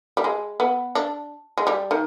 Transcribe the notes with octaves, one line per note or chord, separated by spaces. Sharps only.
G3
G#3
B3
D4
G#3
G3
D#3